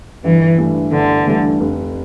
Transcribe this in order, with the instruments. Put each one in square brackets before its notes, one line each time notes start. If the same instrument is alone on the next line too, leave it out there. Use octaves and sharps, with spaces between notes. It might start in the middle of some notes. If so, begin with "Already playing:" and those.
[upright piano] G1 [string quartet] E3
[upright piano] G2 E3 A3
[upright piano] G1 [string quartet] D3
[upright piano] G2 E3 A3
F1